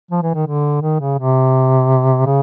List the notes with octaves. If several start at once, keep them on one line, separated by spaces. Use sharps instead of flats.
F3
E3
D#3
D3
D#3
C#3
C3
C#3